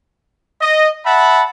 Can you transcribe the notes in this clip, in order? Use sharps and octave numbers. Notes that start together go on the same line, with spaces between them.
D#5
E5 F#5 A5 B5